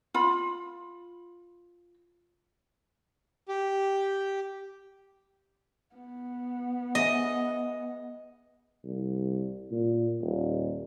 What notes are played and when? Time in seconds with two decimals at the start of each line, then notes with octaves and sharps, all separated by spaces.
0.14 F4 B5
3.48 G4
5.95 B3
6.95 G#4 D#5 E5 G#5
8.85 C2
9.72 A#2
10.22 D#1